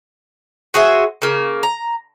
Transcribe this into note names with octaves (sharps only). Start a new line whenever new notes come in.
F#4 G#4 C5 E5
C#3 A#3
A#5